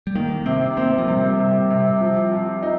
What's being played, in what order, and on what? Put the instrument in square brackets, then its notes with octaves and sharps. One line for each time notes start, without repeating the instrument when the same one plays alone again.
[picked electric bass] G3
[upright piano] D#3 [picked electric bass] A#3
[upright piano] C3 [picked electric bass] C4
[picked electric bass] A#3 [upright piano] C4
[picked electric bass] F3
[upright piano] C3 [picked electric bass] G3
[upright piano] C3
C3
F3
F3
D#4